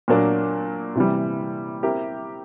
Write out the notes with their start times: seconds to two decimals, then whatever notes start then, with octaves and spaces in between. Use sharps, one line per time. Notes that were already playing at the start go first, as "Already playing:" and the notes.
0.08 A#2 F#3 A#3 D4
0.95 C3 E3 G3
1.83 C4 E4 G4 A#4